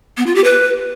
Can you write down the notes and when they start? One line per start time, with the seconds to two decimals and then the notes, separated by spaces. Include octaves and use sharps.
0.17 B3
0.26 F4
0.35 G4
0.44 B4